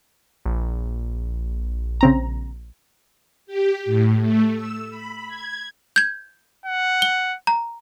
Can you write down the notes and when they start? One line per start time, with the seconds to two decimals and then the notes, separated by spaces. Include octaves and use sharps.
0.45 A#1
2.01 C#3 C4 A#5
3.47 G4
3.86 A2
4.21 A3
4.53 E6
4.90 B5
5.28 G#6
5.96 G6 G#6
6.66 F#5
7.02 G7
7.47 A#5